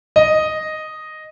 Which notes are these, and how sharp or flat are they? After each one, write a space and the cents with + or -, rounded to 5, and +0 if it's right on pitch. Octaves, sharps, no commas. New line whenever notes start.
D#5 +0